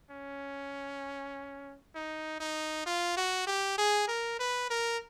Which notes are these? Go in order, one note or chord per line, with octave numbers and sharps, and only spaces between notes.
C#4
D#4
D#4
F4
F#4
G4
G#4
A#4
B4
A#4